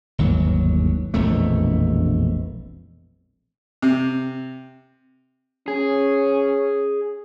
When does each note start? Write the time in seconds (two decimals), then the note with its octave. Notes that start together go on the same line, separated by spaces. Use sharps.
0.18 G1 D#2 G#2 F#3
1.14 E1 A#1 F2 A3
3.82 C3
5.68 C#4 G#4